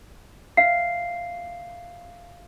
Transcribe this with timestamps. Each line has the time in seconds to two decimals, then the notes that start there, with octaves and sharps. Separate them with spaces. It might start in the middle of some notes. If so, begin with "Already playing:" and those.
0.57 E5 F5 C7